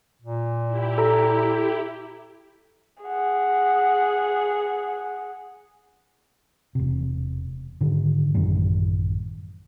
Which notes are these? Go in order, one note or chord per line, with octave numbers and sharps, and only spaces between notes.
A#2
E4 G4
A4 A#5
G#4 F#5
E1 C3
G#2 D3 D#3
A1 F#2 D#3 G3